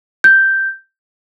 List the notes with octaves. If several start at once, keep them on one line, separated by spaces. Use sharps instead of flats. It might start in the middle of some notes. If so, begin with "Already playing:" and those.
G6